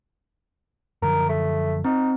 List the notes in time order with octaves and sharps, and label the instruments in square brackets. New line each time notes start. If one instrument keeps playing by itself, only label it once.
[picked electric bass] F#2 D3 F3 [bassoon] A#4
[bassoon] A3
[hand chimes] C4 [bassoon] D#4